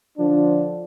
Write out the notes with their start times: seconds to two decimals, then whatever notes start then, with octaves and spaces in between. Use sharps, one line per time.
0.18 D3 F3 D4